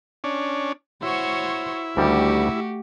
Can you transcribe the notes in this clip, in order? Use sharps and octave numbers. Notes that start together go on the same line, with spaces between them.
C#4 D4
E4 F#4 C5 C#5
D2 D#3 G3 A3 F#4 G4